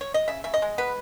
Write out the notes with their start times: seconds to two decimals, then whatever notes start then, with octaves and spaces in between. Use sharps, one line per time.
0.01 C#5
0.14 D#5
0.28 C#3 E5
0.44 C#3 E5
0.54 D#5
0.62 G#3
0.78 B3 B4